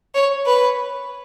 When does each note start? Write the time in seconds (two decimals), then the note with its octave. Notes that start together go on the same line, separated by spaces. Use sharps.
0.15 C#5
0.46 B4